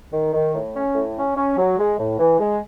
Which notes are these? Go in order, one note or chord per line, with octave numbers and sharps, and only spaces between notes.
D#3
D#3
A2
C#4
A2
C#4
C#4
F#3
G#3
A2
E3
G#3